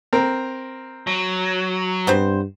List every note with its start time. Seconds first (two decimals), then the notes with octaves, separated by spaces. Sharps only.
0.13 C4 A#4
1.07 F#3
2.07 G2 B3 C4 C5